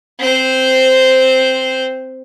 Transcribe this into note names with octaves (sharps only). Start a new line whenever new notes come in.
C4 C5